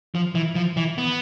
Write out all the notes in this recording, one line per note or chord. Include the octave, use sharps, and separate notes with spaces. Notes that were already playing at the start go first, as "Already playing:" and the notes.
F3
E3
F3
E3
B3